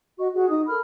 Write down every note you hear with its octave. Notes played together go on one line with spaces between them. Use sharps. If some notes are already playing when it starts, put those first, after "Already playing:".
F#4 D#5 C#6
F#4 G#4
D#4 D#6
A4 A#4 B5 F6